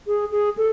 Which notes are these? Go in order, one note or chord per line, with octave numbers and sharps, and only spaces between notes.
G#4
G#4
A4